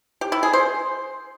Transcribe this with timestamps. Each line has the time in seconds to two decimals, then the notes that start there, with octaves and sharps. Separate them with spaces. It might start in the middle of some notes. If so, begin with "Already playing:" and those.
0.21 G4
0.32 E4
0.43 G#4
0.53 C5